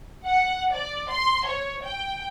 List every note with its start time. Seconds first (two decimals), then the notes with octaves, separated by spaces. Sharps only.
0.25 F#5
0.72 D5
1.10 C6
1.46 C#5
1.83 G5